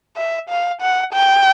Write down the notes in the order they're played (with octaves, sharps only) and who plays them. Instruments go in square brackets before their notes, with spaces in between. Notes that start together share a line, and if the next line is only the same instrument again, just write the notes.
[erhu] E5
F5
F#5
G5